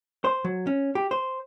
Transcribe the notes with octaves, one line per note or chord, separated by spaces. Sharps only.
C5
F#3
C#4
G4
C5